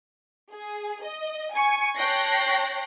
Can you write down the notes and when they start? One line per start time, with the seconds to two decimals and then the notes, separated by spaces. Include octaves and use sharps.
0.50 G#4
1.02 D#5
1.53 G#5 C#6
1.97 C#5 G5 A5 F#6 A#6 C7